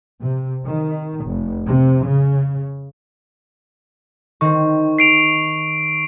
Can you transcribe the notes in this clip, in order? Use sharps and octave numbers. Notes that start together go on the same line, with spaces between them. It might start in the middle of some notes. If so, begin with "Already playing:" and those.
C3
D#3
F1
C3
C#3
D#3 C4 C#6
C7 D7 F7